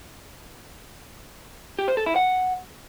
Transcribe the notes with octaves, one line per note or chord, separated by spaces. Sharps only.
G4
C5
A4
E4
F#5